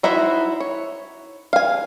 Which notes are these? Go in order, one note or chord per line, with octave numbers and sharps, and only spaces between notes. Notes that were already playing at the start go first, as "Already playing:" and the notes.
D#4 E4 F#4 C5 E5
C#5
F5 G#5